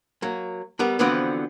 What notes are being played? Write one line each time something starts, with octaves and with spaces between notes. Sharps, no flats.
F#3 A#3
G3 B3 A#4
D3 E3 F3 B3 C4 F#4